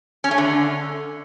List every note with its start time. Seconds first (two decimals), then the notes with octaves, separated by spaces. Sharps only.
0.24 C#4
0.31 A3
0.38 D3